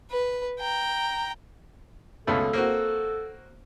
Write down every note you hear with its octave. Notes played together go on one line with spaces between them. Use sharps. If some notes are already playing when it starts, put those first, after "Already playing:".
B4
G5 A#5
C#2 B2 A3 A4
A#3 C4 F#4